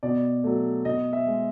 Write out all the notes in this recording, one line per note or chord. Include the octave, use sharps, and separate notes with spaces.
B2 D5
F#3 A3
B2 D#5
E5
G#3